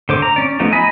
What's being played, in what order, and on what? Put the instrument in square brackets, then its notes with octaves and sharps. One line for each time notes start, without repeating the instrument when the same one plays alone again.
[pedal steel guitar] D3 C5 D6
A#5
C#4 D5
F3 A3 B3 D#4
D#5 G#5 A#5 B5